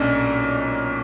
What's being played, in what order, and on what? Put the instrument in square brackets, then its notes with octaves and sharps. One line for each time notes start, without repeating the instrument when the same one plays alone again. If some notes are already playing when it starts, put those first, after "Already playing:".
Already playing: [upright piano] B1 A#2 C#4 D4